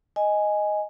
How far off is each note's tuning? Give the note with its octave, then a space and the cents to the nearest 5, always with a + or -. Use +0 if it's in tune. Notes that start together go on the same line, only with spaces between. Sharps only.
D#5 +0 G#5 +0